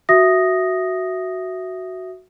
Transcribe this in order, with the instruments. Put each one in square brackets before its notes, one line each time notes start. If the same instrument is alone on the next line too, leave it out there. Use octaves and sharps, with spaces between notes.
[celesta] F#4 E5 D#6 A#6